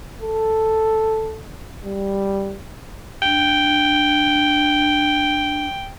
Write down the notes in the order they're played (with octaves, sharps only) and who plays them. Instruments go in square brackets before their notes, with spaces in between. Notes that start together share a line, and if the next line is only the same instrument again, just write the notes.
[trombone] A4
G3
[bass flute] D4 [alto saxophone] G5